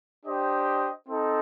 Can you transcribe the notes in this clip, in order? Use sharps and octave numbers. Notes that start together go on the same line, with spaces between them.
D4 G4 C5 D#5
C4 D#4 A4